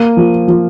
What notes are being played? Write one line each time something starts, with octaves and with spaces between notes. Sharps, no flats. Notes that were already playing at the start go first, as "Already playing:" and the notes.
Already playing: A#3 D#7
F3
F3